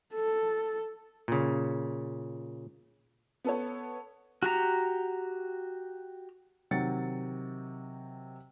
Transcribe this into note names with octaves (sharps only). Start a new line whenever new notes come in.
A4
A#2 C#3
B3 A4 C#5
F#4 G4 A#5
C3 D#3 F#3 G5 A6 C#7